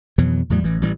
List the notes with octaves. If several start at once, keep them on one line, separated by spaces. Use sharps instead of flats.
F2 B2 E3 F#3
E2 A2 F#3 G3
A1 E3
A1 E3 G3